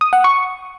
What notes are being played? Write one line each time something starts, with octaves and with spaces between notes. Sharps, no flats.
D#6
F#5
C#6